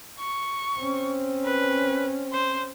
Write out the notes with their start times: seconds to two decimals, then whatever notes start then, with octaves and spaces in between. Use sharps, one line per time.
0.20 C#6
0.79 C4 C#4
1.46 B4
2.32 C5